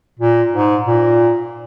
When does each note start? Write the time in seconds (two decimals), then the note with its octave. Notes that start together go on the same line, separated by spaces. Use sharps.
0.19 A#2
0.53 G#2
0.86 A#2